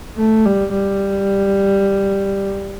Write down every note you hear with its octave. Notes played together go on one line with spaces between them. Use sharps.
A3
G3
G3